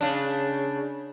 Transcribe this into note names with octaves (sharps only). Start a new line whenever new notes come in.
C#3 D4